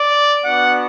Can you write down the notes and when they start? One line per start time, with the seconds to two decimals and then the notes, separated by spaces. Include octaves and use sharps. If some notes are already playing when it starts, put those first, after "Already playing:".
Already playing: D5
0.44 B3 D4 F#4 F#5